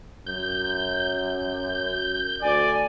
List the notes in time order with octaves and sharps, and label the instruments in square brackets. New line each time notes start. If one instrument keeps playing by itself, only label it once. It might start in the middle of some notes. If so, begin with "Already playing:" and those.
[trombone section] F#2 [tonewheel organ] G6
[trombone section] D2 [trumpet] D5 [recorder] G#5